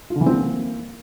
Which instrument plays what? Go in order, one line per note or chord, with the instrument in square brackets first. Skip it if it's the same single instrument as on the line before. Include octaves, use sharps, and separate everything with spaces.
[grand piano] F4
D3
E3
C4
A#3